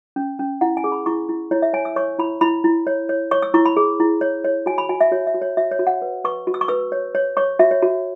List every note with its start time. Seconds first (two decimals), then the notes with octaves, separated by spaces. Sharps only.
0.16 C#4
0.39 C#4
0.61 E4 F#5
0.77 G#5
0.84 G#4
0.92 B5
1.06 E4 C#6
1.29 E4
1.51 E4 C#5
1.62 E5
1.73 C#5 G#5
1.85 E6
1.96 C#5 C#6
2.19 E4 B5
2.41 E4 B5
2.64 E4
2.87 C#5
3.09 C#5
3.31 C#5 C#6
3.42 E6
3.54 E4 C#6
3.66 B5
3.77 G#4
4.00 E4
4.21 C#5
4.44 C#5
4.66 F#4 G#5
4.78 B5
4.89 F#4 G#5
5.01 E5
5.12 F#4 C#5
5.27 E5
5.34 F#4
5.42 C#5
5.57 F#4 E5
5.71 C#5
5.79 F#4
5.87 F#5
6.02 B4
6.24 B4 C#6
6.47 F#4
6.54 E6
6.61 C#6
6.68 B4 E6
6.92 C#5
7.15 C#5
7.37 C#5 C#6
7.59 F#4 E5
7.71 C#5
7.82 F#4